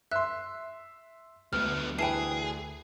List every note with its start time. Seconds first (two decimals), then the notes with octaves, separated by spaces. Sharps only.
0.11 E5 C6 F#6
1.53 D2 G3 B3 F6
1.99 E3 G#4 B4 G5 A5 C7